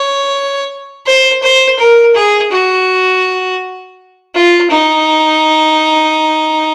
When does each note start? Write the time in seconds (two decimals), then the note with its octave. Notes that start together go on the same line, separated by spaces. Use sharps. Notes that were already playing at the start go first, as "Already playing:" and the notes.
Already playing: C#5
1.06 C5
1.43 C5
1.79 A#4
2.15 G#4
2.52 F#4
4.35 F4
4.70 D#4